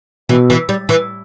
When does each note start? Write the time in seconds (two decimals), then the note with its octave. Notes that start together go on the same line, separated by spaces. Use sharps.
0.29 B2 E3
0.50 E3
0.69 G3
0.89 E3